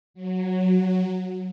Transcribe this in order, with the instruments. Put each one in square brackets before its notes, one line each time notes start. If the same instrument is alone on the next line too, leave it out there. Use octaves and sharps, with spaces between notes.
[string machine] F#3